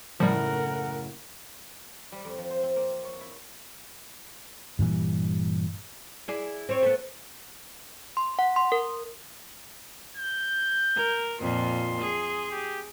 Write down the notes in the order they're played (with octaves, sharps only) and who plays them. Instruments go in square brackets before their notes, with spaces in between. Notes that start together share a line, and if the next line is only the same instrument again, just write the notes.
[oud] F#2 A2 C#3 [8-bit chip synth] F3 G3 [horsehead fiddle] A#4 F#5
[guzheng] G3
F2
F3
C5
C4
A#3
C#5
E4
[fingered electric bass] G2 A#2 E3 G3
[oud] E4 G#4 D5
C4 C#5
A3 B3
[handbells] C6
F#5
C6
A#4
[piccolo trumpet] G6
[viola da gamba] A#4
[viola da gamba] F2 A#2 [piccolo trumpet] C6
[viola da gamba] G#4
[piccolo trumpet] G4